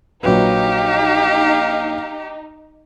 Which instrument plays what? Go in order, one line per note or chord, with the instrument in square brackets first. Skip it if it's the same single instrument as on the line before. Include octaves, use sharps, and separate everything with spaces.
[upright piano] A#1 F#3 B4 [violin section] D#4 [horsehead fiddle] G4 [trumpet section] F5